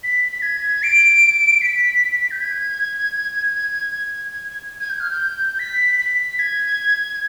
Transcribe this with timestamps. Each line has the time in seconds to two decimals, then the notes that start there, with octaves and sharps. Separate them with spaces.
0.04 B6
0.32 B6
0.42 G#6
0.83 D7
1.61 B6
2.31 G6
2.41 G#6
4.80 G#6
4.90 G6
5.00 F6
5.11 G6
5.59 B6
5.99 B6
6.39 G#6